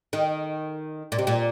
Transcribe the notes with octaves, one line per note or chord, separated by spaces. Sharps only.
D#3
A#2
C3
A#2